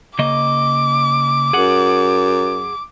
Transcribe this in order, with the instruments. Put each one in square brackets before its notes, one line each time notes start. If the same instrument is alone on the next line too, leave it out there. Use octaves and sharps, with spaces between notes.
[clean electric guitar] C#3 A#3 D#5 [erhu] D6
[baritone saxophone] F#2 [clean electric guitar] G#4 F#5